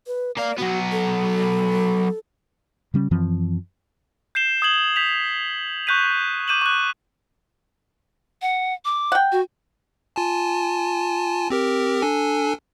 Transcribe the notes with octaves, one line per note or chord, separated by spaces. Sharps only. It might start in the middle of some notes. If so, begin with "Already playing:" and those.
B4
A#3 D5 F5
F#3 B3 F#4
A4
C#3 G3 C#4
F#2 E3 F3 C4
G6 C7 E7 G7
D#6 G#6 F#7 G7
G6 B6 F7
C#6 F#6 G6 B6 D#7
D6 G6 D#7 E7 F#7
C#6 F#6
F#5
D6
F#5 G5
F#4
F4 G#5 A5
C4 G4 A#4
D4 A4 G#5